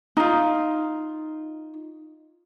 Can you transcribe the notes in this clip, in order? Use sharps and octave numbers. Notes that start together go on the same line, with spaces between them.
D#4 F4